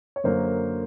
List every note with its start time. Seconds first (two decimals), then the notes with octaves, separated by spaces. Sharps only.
0.16 C#5
0.24 F#2 D3 F#3 A#3 C5